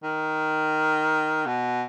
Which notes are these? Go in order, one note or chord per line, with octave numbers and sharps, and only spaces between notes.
D#3
B2